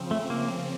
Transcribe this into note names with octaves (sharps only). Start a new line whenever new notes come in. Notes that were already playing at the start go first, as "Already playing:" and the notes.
Already playing: C#3 F3 C4
A3
A#3